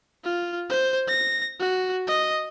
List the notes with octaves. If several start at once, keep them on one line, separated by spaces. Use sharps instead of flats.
F4
C5
A#6
F#4
D#5